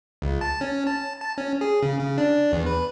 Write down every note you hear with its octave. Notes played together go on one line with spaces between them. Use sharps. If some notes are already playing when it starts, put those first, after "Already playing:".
C#2
A5
C#4
A5
A5
C#4
G#4
C#3
C#3
D4
E2
B4